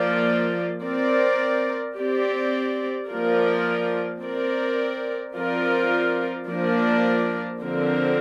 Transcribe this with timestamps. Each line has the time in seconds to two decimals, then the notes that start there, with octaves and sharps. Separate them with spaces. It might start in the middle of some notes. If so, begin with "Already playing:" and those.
Already playing: F3 A#3 F4 D5
0.83 C4 A#4 D5
1.96 C4 G4 D5
3.10 F3 A#3 F4 A#4 D5
4.22 C4 A#4 D5
5.35 F3 C4 F4 A#4 D5
6.48 F3 A#3 D4 A#4 D5
7.61 D3 F3 C4 A#4